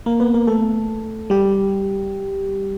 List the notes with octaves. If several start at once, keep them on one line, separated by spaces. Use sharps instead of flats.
A#3 A#4
B3 B4
A#3 A#4
A3 A4
G3 G4